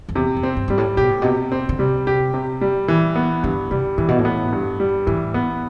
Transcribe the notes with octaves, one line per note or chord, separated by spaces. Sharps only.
F2
E2 C3
F2
C4
G2
G2 G3
A2
B2 G4
A2
B2
C3
C4
D3
C3 G3
G4
C3
G3
E3
B3
G2 D3
C3 G3
A2 E3
B2
A2
B3
G2
G3
A2 E3
B3